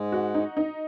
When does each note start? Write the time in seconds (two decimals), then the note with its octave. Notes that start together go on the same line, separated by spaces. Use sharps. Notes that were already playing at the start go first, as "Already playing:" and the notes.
Already playing: G#2 G#3
0.12 F#4
0.34 D#4
0.57 D#4